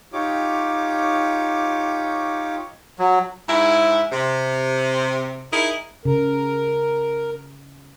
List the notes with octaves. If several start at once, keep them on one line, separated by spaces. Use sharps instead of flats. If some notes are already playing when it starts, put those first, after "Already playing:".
D#4 F4 G4 C#5 D6
F#3
G#2 E4
C3
D#4 E4 G#4 A#4
C#3 A#4